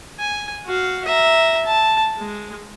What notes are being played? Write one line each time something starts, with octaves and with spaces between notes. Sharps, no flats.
G#5
F#4 F5
E5 A#5
A5
G#3